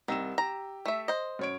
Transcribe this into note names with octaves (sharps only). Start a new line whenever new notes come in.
C2 D#3 E6 E7
G4 A#5
A3 E5
C5 D#5
F#2 C#5 D7